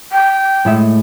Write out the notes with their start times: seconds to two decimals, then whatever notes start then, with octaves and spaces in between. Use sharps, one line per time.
0.12 G5
0.65 A2 G#3 E5